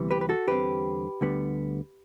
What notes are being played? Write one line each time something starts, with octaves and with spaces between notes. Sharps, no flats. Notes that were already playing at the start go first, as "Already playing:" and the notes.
Already playing: D2 C3 E3 G3 B3
G4 B4
B4
F#4 A4
E2 D3 G3 C4 G4 B4
D2 D3 G3 B3